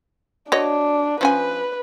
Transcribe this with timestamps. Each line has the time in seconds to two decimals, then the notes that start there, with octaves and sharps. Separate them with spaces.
0.52 D4 F#4 C#5 D#5
1.21 F3 C#4 B4 G#5